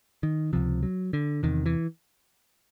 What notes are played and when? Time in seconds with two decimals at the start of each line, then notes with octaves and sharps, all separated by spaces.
0.23 D#3
0.53 C#2 C3 F3
0.83 F#3
1.13 D3
1.43 E2 C3 D#3
1.66 E3